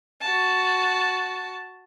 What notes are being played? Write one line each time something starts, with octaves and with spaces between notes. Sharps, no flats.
F#4 A5